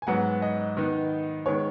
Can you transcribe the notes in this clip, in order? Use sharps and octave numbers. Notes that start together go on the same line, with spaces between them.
G#5
G#2 F#3 B3 F#5
D#5
D#3 B3 D#4
D#3 G#3 B3 C#5